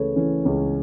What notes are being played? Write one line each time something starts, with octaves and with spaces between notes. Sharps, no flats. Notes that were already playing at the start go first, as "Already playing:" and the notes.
Already playing: C#2 C#3 E3 A3 A4 B4 C#5
E3 C#4
C#2 C#4